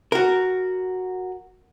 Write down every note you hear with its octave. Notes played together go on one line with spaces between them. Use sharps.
F#4 A#4